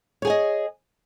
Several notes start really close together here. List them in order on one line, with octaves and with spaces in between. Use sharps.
C#5 G#4 G#5 D#5